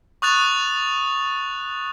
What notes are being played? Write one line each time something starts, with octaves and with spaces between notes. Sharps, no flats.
C#6 D#6 F#6 A6 F7